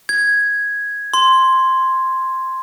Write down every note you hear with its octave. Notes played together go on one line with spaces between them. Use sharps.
G#6
C6